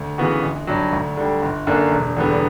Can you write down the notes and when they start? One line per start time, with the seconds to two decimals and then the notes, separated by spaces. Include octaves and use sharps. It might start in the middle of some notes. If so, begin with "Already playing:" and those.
Already playing: D2
0.18 C#3 E3 B3 F#4
0.43 G1
0.67 G2 F#3
0.93 D2
1.17 D3 G3
1.42 G1
1.67 F#2 D3 A#3 D4
1.92 E1
2.17 E2 D3 G3 B3